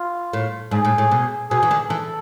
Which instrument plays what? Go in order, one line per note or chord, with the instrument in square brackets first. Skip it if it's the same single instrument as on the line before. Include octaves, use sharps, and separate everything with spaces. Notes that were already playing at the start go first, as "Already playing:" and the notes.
Already playing: [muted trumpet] F4
[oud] A2
[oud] G#2 [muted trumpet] G#4
[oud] A2
A2
B2
[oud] B2 [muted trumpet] G#4
[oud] E3
D3
[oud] E3 [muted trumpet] A4